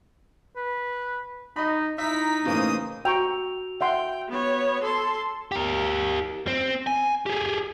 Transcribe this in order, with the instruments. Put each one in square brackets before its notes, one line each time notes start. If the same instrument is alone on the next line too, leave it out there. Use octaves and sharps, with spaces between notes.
[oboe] B4
[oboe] D#4 [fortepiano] D#5 B5
[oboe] D#4 [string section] E4 A#5 B6 [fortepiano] E5
[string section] A2 C5 D#6 [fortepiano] C#3 E3 A#3
[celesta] F#4 E6 F7 [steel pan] G5 A#5 C#6
[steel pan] E5 F#5 C6 [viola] G5
[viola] B3 C#5
A4 C6
[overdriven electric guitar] G4 A#4
C4
G#5
G4 G#4